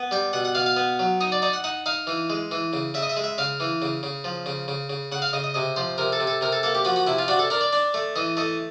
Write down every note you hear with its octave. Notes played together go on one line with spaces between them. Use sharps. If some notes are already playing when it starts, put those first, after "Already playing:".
Already playing: B3
G3 G5
B2 F#5
F#5
B2 F5
F5
B3
F#3
D#4 D#5
D5
D#4 D5
F#5
D#4 F#5
D#4 F5
E3
G#3
E3
C#3
C#3 E5
D#5
E5
G#3
E5
C#3 F5
E3
C#3
C#3
F3
C#3
C#3
C#3
C#3 F#5
F5
C#3 D#5
D#5
C3 D#5
F3 C5
C3 A#4
A4
C3
A4
C3 A#4
A4
A#3 A4
G4
F3 F#4
F#4
C3 E4
F4
D4 F#4
A4
D4 A#4
D5
D4
A3
E3 D#5
A3 D#5